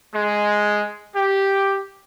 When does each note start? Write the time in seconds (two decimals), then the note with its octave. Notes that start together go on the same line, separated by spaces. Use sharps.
0.15 G#3
1.15 G4